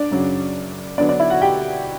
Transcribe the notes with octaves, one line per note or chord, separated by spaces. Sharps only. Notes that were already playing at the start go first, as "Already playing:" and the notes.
Already playing: D4 D5
F#2 C#3 F#3
D3 F#3 B3 D4 D5
D4 D5
E4 E5
F#4 F#5
G4 G5